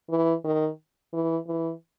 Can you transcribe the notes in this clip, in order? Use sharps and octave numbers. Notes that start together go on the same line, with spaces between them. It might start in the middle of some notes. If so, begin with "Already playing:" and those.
E3
D#3
E3
E3